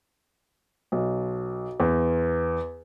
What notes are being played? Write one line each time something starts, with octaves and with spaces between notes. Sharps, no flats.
B1
E2